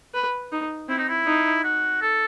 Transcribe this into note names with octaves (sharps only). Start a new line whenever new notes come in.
B4
D#4
C4 E4
D#4
E4
D#4
F#4
A4